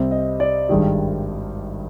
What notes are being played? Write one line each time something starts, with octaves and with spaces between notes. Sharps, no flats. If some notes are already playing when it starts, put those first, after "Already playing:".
Already playing: C2 C3 G3 C4
D#5
D5
G#1 G2 D#3 G3 G#4